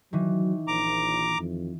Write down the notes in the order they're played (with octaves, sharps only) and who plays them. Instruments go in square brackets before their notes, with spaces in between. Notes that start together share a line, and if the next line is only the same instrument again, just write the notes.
[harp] D#3 E3 [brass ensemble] F#3
[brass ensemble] A#1 [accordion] A#5 D6
[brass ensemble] F2